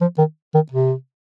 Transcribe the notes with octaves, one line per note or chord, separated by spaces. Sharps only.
F3
D#3
D#3
C3